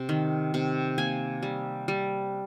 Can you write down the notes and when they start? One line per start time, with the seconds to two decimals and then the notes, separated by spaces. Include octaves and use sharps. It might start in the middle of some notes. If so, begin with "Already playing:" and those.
Already playing: C3
0.09 D#3
0.54 C3
0.98 A#3 G#5
1.43 G3
1.88 G3